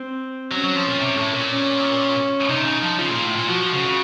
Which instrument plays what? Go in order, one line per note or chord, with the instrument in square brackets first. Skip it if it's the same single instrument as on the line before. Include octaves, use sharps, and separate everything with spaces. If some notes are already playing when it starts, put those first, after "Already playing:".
Already playing: [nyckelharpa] C4
[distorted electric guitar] F#3 [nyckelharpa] C#4
[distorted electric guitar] F#3
F3
A#2
C3
A2
A#2
[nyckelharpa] C#4
[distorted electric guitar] C3 [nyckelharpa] D#4
[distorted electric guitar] C#3
F3
[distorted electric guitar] C#3 [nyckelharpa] F4
[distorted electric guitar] A#2
A2
A#2
[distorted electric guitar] F3 [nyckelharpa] F#4
[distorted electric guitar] F3
C#3
C#3